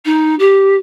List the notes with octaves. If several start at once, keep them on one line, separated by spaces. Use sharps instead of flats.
D#4
G4